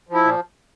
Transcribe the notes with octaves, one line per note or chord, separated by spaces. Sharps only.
F3 E4
A#2